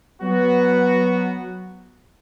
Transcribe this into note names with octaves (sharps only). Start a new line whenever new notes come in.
F#3 B3 F#4